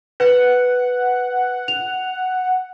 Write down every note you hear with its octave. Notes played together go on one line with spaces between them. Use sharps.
B4 F#5
F7